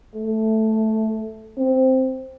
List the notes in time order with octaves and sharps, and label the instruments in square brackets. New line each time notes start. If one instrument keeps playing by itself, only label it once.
[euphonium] A3
C4